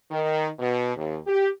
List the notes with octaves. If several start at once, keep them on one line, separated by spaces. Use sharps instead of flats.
D#3
B2
D#2
G4